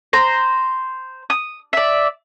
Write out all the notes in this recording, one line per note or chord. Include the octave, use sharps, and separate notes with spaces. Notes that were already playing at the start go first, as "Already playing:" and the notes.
C5 A#5
D#6
D5 E5